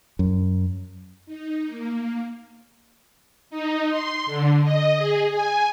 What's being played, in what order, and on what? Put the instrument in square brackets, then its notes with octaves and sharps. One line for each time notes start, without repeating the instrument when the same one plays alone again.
[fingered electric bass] F#2
[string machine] D#4
A#3
D#4
C6
D3
D#5
G#4
G#5